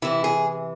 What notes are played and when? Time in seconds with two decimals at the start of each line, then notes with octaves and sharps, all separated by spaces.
0.02 C3 E3 E4
0.24 G#4